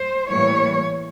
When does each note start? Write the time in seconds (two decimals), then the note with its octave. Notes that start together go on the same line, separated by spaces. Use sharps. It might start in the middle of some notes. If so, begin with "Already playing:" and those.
Already playing: C5
0.29 A2 E3 G3 A#3 C#5